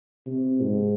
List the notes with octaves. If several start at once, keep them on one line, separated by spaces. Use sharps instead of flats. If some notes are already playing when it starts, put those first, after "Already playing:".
C3
G#2